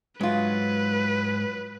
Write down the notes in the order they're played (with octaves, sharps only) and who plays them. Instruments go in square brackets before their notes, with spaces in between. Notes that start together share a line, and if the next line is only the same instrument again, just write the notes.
[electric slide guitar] G#2 C#3 G#3 [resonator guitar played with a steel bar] F#3 F4 [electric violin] B4